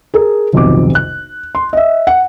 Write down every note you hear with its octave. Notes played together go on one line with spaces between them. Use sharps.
G#4 A#4
D#1 B1 F2 C3 D6
F#6
C6
D#5 E5
F#5